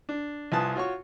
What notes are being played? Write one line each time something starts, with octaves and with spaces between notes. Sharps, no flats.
D4
C2 F4 B4 G#5 A5 D#6
F4 F#4 C#5 C#6